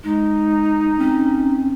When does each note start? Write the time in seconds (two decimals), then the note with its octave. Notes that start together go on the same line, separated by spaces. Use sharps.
0.04 G#3 D#4
0.99 C4 C#4